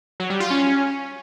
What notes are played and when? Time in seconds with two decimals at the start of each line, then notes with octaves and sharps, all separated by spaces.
0.20 F#3
0.30 G3
0.40 F4
0.51 C#4